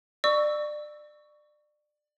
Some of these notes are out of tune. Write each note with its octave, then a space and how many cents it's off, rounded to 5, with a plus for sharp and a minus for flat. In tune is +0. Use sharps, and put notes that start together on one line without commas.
D5 +25 C#6 +15 E6 +0